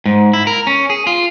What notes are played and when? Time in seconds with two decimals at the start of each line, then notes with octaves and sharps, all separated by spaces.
0.06 G#2
0.33 E4
0.47 A#4
0.67 C#4
0.90 G#4
1.07 F4